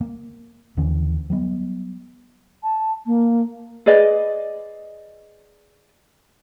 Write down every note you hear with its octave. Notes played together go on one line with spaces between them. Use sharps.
A#3
D#2 D3 E3 C#4
F#3 G3 B3
A5
A#3
G#4 B4 D5 D#5